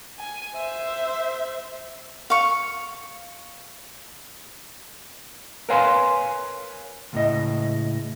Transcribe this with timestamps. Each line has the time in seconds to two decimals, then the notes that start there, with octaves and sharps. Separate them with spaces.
0.20 G#5
0.56 C5 E5
2.30 F5 C#6
5.69 A#4 B4 C#5 F5 G#5 C6
7.13 C#2 A2 D#5